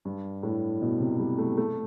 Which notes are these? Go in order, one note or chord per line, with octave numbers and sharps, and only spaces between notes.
G2
A2
B2
C3
G3
A3
A3